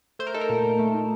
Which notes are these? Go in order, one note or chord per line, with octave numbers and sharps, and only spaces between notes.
A3 C5
A#4
D#4 A4
A#4
A#2
A#2
A3
D#4